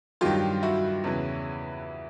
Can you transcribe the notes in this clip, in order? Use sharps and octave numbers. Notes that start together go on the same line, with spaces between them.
G2 D#3 F#3 F4 G4
E4 F#4
E2 C#3 E3